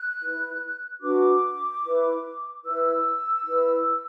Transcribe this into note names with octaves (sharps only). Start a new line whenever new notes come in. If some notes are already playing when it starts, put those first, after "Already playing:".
Already playing: F#6
E4 B4
D4 F#4 B4 D6
E4 B4
E4 B4 E6
E4 B4